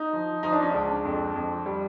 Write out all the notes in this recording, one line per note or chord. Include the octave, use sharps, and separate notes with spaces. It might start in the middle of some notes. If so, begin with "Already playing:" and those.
Already playing: D#4
F3
F3 D#4
D4
C#4
C#2 D4
F2
F2
G3